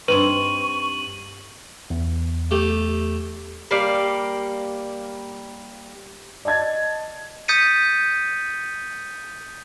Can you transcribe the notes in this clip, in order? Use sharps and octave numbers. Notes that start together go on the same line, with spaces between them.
G2 C4 D#4 B4 C#6 D#7 F#7
E2
A3 G4
G3 A#3 D5 F5
D5 D#5 A5 G#6 A6
D#6 G6 A6 B6 C#7 D#7